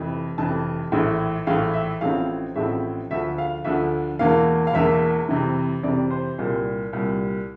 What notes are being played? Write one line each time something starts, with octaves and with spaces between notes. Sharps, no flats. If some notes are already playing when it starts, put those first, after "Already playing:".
Already playing: F1 F2 E3
F1 F2 E3 A5
A#1 A2 E3
A#1 A2 E3 F5
E5
A1 A2 F3 C4 F5
A1 A2 F3 C4 E5
D2 D3 F3 E5
F5
D2 D3 F3 E5
E1 E2 E3 A#3 F5
F5
E1 E2 E3 A#3 E5
F2 C3 E3
F2 C3 E3 D5
C5
C2 A#2 G3
C2 A#2 G3